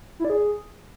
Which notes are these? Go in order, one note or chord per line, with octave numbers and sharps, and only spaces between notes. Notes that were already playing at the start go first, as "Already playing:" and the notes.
E4
D5
G#4